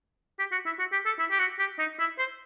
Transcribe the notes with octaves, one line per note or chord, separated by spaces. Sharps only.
G4
F#4
E4
F#4
G4
A4
E4
G4
F#4
G4
D#4
E4
C5